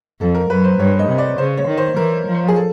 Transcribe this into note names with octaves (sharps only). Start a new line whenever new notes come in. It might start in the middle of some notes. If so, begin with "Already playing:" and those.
F2 A4
A#4
F#2 B4
C5
G2 C#5
D#5
C3
D5
C#3 C5
C#5
D#3
C5
E3 A#4
F3
G#4
A4